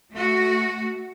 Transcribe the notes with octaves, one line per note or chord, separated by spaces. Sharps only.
A3 F#4